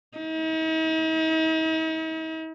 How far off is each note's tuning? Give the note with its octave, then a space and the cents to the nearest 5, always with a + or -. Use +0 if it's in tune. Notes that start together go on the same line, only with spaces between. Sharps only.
D#4 +45